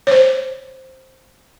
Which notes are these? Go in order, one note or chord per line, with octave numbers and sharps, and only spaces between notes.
C5 C#5